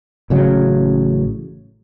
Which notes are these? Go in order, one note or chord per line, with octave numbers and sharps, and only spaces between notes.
A1 C#3 F#3